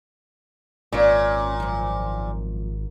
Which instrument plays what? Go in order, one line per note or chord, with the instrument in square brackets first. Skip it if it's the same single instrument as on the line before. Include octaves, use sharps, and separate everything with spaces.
[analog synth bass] G#1 [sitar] A#2 [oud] C#4 C#5 D5
[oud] F#2 F3